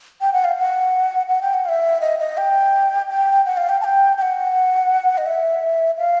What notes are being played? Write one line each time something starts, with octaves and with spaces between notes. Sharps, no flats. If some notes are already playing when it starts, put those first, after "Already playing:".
G5
F#5
F5
F#5
F#5
G5
F#5
F5
E5
D#5
D#5
G5
G5
F#5
F5
G5
A5
G5
G5
F#5
D#5
E5
F5